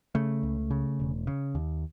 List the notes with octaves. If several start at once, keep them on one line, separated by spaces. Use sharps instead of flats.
C#3 A3
C#2
C#3
E1
C#3
D#2